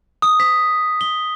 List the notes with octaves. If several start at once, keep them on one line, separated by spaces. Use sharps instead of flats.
D#6
B6
G7